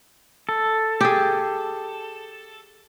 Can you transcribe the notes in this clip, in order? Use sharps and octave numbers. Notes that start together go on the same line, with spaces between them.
A4
G4 G#4